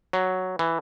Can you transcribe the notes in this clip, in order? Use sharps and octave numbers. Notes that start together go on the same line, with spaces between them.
F#3
E3